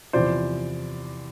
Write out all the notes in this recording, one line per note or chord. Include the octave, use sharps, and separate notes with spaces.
E2 C3 F3 C5 D5